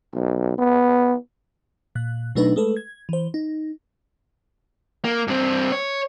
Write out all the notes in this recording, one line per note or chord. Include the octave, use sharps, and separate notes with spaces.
B1
B3
A#2 F#6
B2 F#3 A3 D4 D#4 B4
G#3 A3 A4 B4
G#6
E3 C5
D#4
A#3
G2 C4
C#5